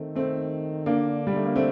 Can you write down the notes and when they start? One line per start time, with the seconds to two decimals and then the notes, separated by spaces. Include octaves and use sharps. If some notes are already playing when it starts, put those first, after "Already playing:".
Already playing: D#3 A3 C4
0.15 A3 C4
0.86 D3 A#3 D4
1.27 G3
1.36 A3
1.45 A#3
1.56 A3 C4